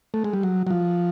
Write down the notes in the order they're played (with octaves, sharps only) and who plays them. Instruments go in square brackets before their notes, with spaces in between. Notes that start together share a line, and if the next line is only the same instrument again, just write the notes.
[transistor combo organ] A3
G#3
G3
F#3
F#3
F3